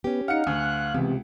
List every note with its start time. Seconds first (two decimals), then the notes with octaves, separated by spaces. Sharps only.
0.04 B3 C#4 G4
0.28 D#4 F5 F#5 C#7
0.47 D2 G#5 F#6
0.94 C#2 C3 E3 B3